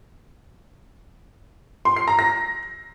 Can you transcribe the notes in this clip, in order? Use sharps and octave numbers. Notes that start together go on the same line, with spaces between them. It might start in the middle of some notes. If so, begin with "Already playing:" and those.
C6
C7
A#5
A#6